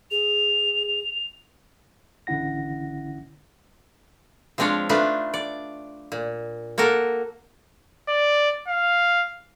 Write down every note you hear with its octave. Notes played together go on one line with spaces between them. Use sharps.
G#4 F7
A1 D3 C#4 E4 F#5 A#6
F3 G#3 C4 D4 C#5 F5
A3 D4 D#4 F4 B4
D5
A#2
A#3 F#4 A4 A#4
D5
F5